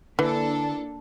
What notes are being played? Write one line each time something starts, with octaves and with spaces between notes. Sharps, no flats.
D3 E3 A#3 D4 A4